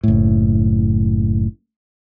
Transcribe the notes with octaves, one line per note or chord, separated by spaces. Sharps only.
F#1 A2